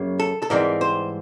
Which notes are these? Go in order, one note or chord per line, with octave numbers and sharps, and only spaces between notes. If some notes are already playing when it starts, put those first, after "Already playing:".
Already playing: F#2 C#3 F#3 A#3
A4
A4
G#2 E3 G3 C4 A#4
C5